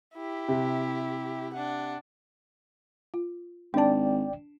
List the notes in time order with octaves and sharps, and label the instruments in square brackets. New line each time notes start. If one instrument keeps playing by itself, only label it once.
[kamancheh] E4 G4
[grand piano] C3
[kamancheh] D4 F#5
[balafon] F4
[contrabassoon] G#1 [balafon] D4 A5 [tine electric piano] D5 G5